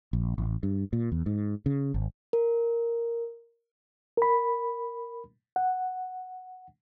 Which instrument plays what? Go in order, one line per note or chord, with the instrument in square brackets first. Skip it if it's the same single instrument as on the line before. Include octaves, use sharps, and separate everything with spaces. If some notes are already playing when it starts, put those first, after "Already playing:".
[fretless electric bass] A#1
A1
G2
A#2
E2
G#2
C#3
G#1
[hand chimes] A#4
[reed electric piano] A#4 B5
F#5